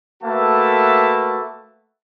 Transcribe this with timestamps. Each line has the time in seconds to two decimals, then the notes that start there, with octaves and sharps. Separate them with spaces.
0.23 A3 A#3 F#4 B4 E5 A5